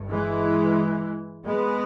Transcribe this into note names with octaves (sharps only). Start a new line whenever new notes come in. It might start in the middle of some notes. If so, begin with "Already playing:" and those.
Already playing: G1 G2
E3 G#3
G#3 B3